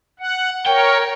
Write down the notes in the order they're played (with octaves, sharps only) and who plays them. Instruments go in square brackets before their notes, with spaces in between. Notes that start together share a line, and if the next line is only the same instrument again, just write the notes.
[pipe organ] F#5
[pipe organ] A#4 C#5 [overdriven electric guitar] G5